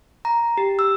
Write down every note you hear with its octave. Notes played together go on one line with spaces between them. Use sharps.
A#5
G4
E6